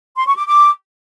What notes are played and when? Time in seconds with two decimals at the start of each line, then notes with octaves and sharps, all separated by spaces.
0.17 C6
0.27 C#6
0.37 D6
0.47 D6